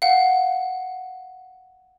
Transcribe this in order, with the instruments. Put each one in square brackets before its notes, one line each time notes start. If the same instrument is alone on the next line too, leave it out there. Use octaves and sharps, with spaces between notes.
[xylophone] F5 F#5